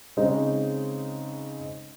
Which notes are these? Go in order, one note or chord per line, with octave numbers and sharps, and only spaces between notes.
C#3 G#3 C4 D#4